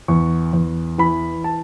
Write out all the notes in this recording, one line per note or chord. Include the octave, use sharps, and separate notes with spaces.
E2 C#6
E2
E3 B5
A5